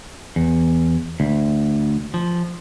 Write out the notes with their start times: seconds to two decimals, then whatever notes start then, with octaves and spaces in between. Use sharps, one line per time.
0.36 E2
1.20 D2
2.14 F3